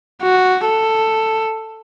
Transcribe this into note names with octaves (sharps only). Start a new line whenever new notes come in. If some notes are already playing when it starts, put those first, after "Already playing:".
F#4
A4